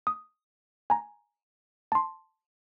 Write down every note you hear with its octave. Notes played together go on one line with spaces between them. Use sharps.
D#6
G#5 A#5
A5 C6